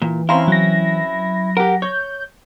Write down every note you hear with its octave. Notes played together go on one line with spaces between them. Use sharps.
A#2 E3
C4 C#4 E4 F5 A#5 C6
F#3 A#6
G4 A#4 F#5
C#5 G6